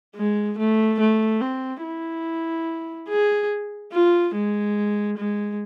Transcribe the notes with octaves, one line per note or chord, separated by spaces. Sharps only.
G#3
A3
A3
C4
E4
G#4
F4
G#3
G#3